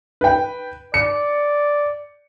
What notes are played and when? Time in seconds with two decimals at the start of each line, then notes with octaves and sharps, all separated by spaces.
0.21 B4 G5
0.94 D5 C#7